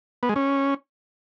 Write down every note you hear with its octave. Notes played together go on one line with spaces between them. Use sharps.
B3
G#3
C#4